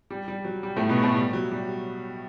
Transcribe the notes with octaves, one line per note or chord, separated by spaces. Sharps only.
G3
G3
F#3
G3
A2 A3
B2 B3
A2 A3
G3
F#3
G3